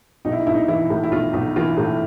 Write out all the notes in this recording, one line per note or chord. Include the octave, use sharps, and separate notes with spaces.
B1 D#4
E4
D#4
B1 E4
D#4
E3 E4
A2
E4
B1 F4
B1
E3 F4
A2